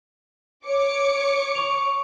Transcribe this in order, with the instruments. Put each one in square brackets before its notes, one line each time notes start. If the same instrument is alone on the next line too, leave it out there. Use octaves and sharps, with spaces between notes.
[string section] C#5 D6 C#7
[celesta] C#6 F7